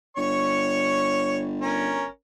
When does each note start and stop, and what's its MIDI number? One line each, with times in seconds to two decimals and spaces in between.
0.17 2.08 31
0.17 1.43 73
0.17 1.43 85
1.61 2.05 61
1.61 2.05 70